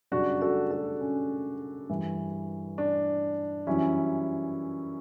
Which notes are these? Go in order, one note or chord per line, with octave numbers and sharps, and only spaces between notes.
F#2 C#3 G3 D4 F#4
F#4 A4
F#4 A4
C#4
G2 E3 G3
D4
F#2 E3 G3 C#4 E4